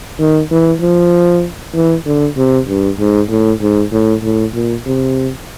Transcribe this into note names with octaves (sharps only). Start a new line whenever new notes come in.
D#3
E3
F3
E3
D3
C3
G2
G#2
A2
G#2
A2
A2
A#2
C3